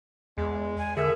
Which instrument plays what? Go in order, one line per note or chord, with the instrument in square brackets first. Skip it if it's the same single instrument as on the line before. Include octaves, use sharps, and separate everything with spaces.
[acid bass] E2 [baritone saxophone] G#3
[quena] G#5
[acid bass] D3 [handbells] G#4 A#4 [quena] E5